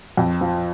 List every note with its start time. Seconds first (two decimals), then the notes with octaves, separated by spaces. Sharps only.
0.17 F2
0.41 F3